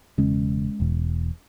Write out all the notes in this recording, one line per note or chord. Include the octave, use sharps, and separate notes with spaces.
E1 E2 C#3 G#3 C#4
E1 E2 B2